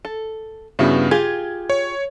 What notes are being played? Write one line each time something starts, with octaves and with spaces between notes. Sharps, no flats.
A4
G2 C#3 B3 E4 F#4
F4 G4 G#4 G#6
C#5